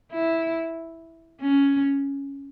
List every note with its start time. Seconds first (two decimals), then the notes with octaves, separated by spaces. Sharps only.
0.12 E4
1.41 C#4